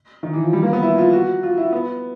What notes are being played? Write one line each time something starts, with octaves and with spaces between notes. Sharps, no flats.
D#3
E3
F3
G3
A#3
B3
E4
F4
F#4
F4
E4
B3